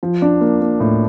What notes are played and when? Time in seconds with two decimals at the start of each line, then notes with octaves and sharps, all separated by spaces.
0.03 F3
0.22 D4
0.41 A#3
0.61 A#3
0.80 A2